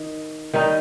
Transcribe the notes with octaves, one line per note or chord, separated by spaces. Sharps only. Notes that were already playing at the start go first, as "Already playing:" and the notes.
Already playing: D#3
D#3 G3 D#4